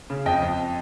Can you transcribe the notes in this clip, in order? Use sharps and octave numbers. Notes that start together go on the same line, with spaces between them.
C#3
F2 D#5 G5
F2